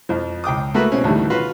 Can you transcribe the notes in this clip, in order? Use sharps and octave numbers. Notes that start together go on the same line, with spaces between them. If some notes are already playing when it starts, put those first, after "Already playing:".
F2 F3
C#2 G5 D6 D#6
A3 A#3 F#4 B4
B2 C4 C#4
D2 A2 D#3 E3 G3
F4 F#4 B4 F5